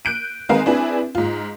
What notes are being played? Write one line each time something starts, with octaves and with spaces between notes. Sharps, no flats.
F#6 G6 D7 D#7
D#3 G#3 C4 B4 F5 A#5
C4 D4 E4 G#4 B4
G#2 F4